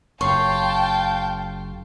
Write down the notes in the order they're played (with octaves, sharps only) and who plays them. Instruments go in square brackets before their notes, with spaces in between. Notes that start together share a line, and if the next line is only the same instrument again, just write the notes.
[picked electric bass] F#1 [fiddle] F4 F5 [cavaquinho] C#5 C6 [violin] G5 A5